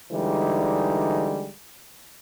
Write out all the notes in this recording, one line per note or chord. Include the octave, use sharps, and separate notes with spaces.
D3 E3 G3 G#3 D#4